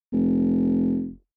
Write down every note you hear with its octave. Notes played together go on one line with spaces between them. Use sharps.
F1